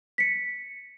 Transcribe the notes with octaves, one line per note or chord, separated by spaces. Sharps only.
B6 C#7